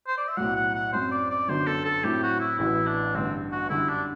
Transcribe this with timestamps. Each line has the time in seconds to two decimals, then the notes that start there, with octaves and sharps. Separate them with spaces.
0.07 C5
0.18 D5
0.28 E5
0.37 B1 A2 F#3 F#5
0.56 F#5
0.75 F#5
0.93 F#2 F#3 C4 C5
1.12 D5
1.31 D5
1.48 G1 F#2 D3 F#3 C5
1.67 A4
1.85 A4
2.04 A2 F#3 C4 E4 G4
2.23 F#4
2.40 E4
2.59 A1 A2 E3 B3 E4 F#4
2.87 D4
3.14 A1 G2 D3 C4
3.52 F#4
3.70 F#2 D3 G3 E4
3.89 D4